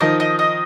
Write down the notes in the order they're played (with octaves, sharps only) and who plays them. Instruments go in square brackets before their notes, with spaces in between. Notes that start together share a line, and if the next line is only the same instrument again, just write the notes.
[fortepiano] D#3 F3 [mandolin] D#5
[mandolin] D#5
D#5